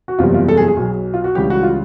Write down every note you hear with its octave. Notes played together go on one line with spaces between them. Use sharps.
F#4
F#1 E2 C3 E3 G3 F4
F4
A4
G#4
G#4
B1 B2 F#3
F4
F#4
C#2 C#3 E3 G3 G4
F#4
F4